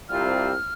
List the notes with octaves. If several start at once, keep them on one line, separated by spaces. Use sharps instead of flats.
C2 C3 G3 C4 F4 F6